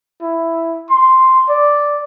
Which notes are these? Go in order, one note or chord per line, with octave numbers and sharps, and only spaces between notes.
E4
C6
D5